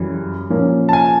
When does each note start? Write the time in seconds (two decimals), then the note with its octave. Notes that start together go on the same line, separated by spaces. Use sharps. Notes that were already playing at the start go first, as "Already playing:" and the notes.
Already playing: F#2 C#3 E3 G3
0.50 A#2 F3 A#3 C#4
0.89 A5
0.93 G#5